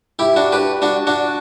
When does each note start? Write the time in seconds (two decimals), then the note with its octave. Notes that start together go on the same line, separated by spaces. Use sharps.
0.19 E4 G4
0.36 D4 F#4
0.52 G4 B4
0.82 D4 F#4
1.07 D4 F#4